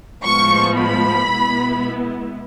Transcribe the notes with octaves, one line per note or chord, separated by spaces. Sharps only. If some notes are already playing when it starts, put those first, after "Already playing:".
A2 F3 G#3 B3 C#6
B5
B2 G#3 B3 E4